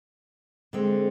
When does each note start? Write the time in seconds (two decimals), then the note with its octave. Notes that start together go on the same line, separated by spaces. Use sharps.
0.73 D3 G#3 C4